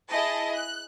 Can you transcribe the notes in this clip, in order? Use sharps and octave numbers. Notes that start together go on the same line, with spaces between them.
E4 G#4 D#5 A5
F#6